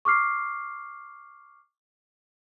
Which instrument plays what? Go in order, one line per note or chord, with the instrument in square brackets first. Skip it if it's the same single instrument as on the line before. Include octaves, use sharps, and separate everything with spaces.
[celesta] C#6 D6 F6 C7